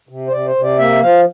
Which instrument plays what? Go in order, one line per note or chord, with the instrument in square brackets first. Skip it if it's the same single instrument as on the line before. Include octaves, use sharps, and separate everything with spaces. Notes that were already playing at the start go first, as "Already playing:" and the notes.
[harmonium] C3
C5
C3 D5
C5
C3
D5
A#3 E5
F3 F5